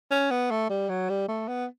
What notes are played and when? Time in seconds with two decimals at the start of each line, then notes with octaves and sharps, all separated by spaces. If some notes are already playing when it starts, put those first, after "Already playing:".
0.11 C#4
0.31 B3
0.51 A3
0.70 G3
0.89 F#3
1.10 G3
1.28 A3
1.48 B3